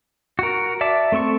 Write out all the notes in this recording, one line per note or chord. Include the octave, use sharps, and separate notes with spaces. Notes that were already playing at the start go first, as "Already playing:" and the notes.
F#4 A#4
D5 E5 A5 D6
A3 C4 A4 C#6